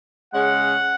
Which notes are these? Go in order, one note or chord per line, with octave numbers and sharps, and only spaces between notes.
C#3 G#3 C#4 F#5